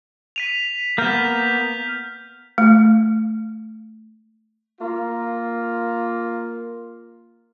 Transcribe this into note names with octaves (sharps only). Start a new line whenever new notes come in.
B6 D#7 F7
A#3 B3 F6 G6 B6
A3
A#3 F4